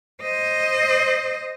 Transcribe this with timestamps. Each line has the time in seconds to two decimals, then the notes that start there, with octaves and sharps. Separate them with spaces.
0.22 C5 D#5